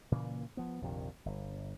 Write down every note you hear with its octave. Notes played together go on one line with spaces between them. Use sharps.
A#2 C#3 E3 A#3
F3 B3
A#1 F2 C3 D#3
G1